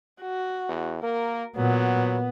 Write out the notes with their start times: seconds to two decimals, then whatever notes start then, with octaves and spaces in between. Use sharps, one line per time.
0.22 F#4
0.69 E2
1.02 A#3 A#4
1.56 A#2 F#3 B3